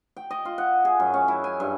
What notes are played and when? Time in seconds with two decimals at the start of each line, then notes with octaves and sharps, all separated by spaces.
0.16 G5
0.31 D#5
0.45 F4
0.58 F#5
0.85 G#4
1.00 F#2
1.14 C#4
1.28 E4
1.44 G#5
1.60 G2